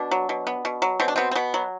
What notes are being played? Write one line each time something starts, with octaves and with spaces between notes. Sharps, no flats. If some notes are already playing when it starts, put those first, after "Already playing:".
Already playing: B2 D4
F#3
B2
B3
B2
F#3
B2 C4
D4
B3 C4
C4
B2 B3
F#3